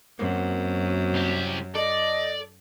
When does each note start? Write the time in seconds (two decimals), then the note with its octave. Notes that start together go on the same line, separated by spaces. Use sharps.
0.19 F#2 A#3 C4 F#4
1.14 C2 G4
1.75 A4 D5 D#5